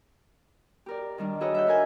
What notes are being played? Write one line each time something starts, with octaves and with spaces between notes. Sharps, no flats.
G4 A#4 D5
D#3 G3 D4
F#4 G#4 A4 B4 C#5 D#5
E5 F#5 G6
D4 A#4 G#5 G6